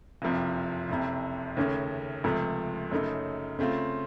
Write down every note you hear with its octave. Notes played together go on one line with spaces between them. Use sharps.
F#1 F2 C3 F3
F#1 F2 C3
D#2 C#3 A3 C#4
C#2 C3 F3 A3
F#2 C#3 A3 D#4
C#3 A3 C4 F4